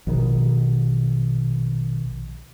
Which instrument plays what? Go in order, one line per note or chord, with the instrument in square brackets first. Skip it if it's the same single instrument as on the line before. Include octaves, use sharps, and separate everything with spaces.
[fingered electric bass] A#1 B2 D#3